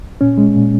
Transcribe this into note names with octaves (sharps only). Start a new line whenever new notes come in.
A#2 C#4
G#3
A#2